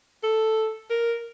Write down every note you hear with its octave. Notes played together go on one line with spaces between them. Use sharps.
A4
A#4